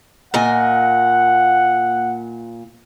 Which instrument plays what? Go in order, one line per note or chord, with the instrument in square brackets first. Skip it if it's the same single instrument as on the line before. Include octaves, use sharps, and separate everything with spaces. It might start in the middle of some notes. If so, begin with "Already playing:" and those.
[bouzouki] A#2 D#5 G#5 [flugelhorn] F#5